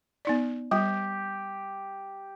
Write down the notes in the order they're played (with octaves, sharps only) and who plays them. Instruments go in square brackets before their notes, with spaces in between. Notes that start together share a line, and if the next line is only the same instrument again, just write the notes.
[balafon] B3 D#4 D5
[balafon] G3 [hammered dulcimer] G4